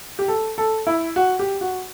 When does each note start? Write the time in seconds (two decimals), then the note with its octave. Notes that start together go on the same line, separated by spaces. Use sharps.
0.19 G4
0.28 A4
0.58 A4
0.87 E4
1.16 F#4
1.39 G4
1.61 F#4